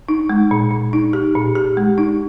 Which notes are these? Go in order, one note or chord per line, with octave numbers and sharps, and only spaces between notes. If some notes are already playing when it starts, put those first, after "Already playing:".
D#4
G#3
A#2
A#2
D#4
G4
A#2
G4
G#3
D#4